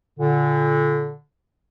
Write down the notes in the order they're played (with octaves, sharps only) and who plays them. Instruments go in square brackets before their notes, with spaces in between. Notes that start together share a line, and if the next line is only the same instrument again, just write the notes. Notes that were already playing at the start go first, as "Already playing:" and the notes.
[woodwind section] A#2 D3